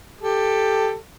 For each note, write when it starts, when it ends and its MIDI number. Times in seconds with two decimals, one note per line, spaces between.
0.21 0.95 67
0.21 0.95 69